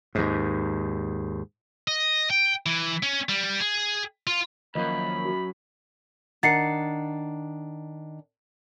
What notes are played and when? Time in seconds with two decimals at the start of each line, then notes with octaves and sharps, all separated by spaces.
0.15 D#2 G#2
1.88 D#5
2.30 G5
2.66 E3
3.03 C#4
3.29 G3
3.60 G#4
4.27 F4
4.75 C#2 F#2 D#3 F3 A#3 D#5 B5
5.25 F#4
6.43 D#3 D4 F#5 A6 C7 C#7